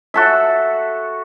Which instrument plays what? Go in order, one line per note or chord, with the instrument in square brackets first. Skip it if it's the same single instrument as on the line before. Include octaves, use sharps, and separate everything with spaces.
[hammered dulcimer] F#4 A4 E5